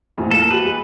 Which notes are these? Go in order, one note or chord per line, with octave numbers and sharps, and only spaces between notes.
A1 F2 A#2
A#3 A4
F#4 G4 B4
G#3